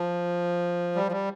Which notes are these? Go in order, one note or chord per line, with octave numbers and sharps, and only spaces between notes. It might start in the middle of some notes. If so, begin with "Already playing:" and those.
Already playing: F3
G3
F3
G3